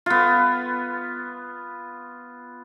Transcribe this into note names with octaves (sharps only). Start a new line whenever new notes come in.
B3 F4